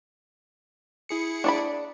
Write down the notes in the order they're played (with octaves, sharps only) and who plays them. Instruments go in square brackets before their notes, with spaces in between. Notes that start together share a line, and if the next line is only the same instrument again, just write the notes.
[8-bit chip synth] E4 G#4 C#7
[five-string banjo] D4 D5 B5